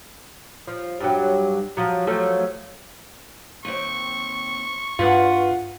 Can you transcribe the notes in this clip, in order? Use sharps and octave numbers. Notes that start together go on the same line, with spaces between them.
F3
G2 F#3
F3 F#3
F3 F#3 A3
D#2 C4 C#6
G2 F4 G#4 B4 F#5